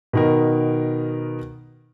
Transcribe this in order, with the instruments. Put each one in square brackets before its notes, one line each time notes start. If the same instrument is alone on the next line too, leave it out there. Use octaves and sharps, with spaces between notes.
[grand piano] B2 D#3 A#4